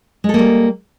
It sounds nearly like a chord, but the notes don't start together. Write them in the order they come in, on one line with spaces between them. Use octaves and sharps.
G#3 A4 A#3 G3